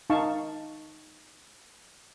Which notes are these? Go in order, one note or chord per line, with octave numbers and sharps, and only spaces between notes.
D#4 F5 A5 C#6